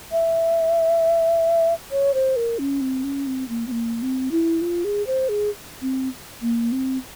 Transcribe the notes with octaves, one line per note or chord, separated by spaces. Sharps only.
E5
C#5
C5
A#4
C#4
C4
C#4
C4
A#3
C4
A#3
C4
E4
F4
G#4
C5
G#4
C4
A#3
C4